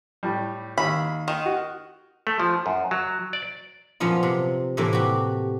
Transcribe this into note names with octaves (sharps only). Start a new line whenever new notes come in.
A2 G3
D#2 B5
D#3
F#4
A3
F3
F#2
F#3
D5
F#2 A#2 F3 B3 F4
C3
A2 C3 E3 A#3
F#4 G4